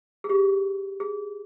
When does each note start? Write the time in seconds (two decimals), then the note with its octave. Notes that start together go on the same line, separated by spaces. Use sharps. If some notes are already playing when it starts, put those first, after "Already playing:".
0.24 G#4
0.29 G4
1.00 G#4